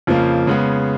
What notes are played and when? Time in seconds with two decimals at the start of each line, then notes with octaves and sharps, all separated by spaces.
0.07 F2 C#3 F3 A#3
0.47 C#3 G#3 B3